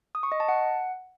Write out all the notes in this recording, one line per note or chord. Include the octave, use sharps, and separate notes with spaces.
D#6
C#6
D#5
A5
F#5